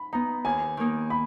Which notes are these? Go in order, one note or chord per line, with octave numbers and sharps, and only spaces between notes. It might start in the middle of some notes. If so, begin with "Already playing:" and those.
Already playing: B5
B3 D#4 A#5
D#2 G#5
D#3 A#3 D#4
B5